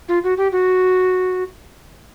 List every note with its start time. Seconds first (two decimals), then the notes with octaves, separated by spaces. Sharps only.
0.09 F4
0.24 F#4
0.38 G4
0.52 F#4